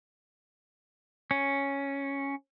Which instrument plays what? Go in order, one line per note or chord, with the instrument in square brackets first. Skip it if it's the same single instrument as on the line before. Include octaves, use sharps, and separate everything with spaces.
[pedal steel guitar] C#4